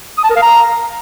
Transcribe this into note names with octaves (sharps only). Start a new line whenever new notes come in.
D#6
A5
A#4
F5
A#5